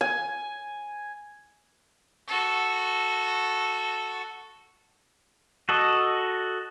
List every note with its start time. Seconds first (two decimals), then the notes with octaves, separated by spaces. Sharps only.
0.01 G#5
2.28 F#4 A4
5.69 F#4 A4 D#5